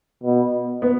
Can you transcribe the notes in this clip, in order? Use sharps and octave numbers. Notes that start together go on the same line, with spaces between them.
B2
B3